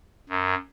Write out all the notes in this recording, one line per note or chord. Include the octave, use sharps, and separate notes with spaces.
F#2